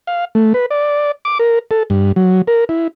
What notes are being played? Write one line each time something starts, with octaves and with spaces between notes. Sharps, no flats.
F5
A3
B4
D5
D6
A#4
A4
G2
F#3
A#4
E4